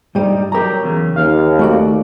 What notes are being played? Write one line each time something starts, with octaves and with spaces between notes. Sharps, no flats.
G2 G3 D#4
F#3 G4 A#4 A#5
E2 C#3 F#3
D#2 F5
A3 F#4 D5